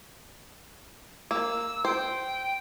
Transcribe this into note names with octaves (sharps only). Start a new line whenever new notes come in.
A#3 E6
C5 G5